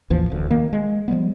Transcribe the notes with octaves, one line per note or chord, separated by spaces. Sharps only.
A1 D#2 E3 F3
D1 D2
D#3 A#3
G#3
F3 G3 G#3 B3